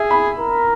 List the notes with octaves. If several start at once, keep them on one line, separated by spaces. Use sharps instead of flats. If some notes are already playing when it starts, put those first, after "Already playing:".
Already playing: G#4 E5
B5
A#4